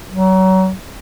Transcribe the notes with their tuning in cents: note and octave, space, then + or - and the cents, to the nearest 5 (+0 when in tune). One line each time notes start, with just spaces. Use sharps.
F#3 +30